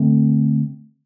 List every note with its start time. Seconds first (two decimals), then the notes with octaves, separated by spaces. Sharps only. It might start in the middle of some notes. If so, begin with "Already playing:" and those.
Already playing: D3 A3 C4